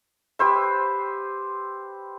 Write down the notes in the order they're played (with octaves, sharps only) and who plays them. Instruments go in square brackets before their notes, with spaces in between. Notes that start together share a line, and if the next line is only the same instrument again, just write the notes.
[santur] G4 B4 C5 E5